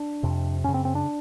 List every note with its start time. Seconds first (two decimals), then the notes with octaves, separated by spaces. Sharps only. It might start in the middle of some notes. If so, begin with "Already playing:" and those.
Already playing: D4
0.23 F2 C3
0.64 F#2 C#3 C#4
0.74 C4
0.85 C4
0.95 D4